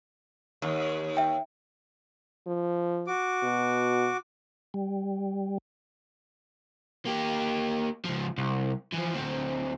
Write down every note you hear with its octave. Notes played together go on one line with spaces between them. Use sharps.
D#2
E5 G5
F3
F#4 D6
B2
G3
A#3 G4
C#2 F3
C2
E3 F3
D2 C4